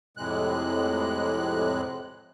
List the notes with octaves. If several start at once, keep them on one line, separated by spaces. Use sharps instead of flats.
F2 A2 C3 G#3 F#6